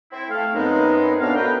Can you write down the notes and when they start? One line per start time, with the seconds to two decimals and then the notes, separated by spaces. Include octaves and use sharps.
0.11 C4 E4
0.29 A3 A4 F5
0.53 F#2 G#3 B3 C4 D#4
1.20 A2 B3 D4 F#4 F5
1.35 A#4 B4 D#5 G5